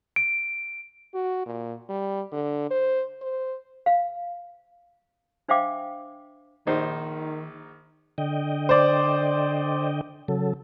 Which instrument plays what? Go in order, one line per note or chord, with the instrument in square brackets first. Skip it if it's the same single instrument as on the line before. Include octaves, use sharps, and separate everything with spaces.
[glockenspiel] D7
[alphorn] F#4
A#2
G3
D3
C5
C5
[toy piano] F5
D4 C5 E5 F5 G5 D6
[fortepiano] A#1 D#4 C5 [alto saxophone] D#3
[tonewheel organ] D3 D#5 G5
[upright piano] C5 D5
[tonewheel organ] C#3 F#3 A4